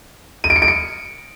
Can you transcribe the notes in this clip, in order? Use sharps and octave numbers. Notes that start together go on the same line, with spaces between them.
D#7
D7
C#7
D7
C#7